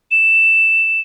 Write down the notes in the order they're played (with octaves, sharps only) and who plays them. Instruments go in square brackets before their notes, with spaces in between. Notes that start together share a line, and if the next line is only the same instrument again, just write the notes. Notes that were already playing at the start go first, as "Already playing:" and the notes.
[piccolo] E7